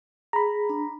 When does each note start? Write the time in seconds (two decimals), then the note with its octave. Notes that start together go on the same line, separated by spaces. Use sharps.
0.33 G#4 A#5 B5
0.69 D4